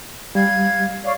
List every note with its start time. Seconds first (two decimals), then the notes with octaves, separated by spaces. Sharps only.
0.35 G3 F5 G#6
1.04 C#5 D5 F5